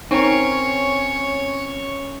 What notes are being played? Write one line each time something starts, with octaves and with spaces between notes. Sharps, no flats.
C4 C#4 D#4 A#4 C#5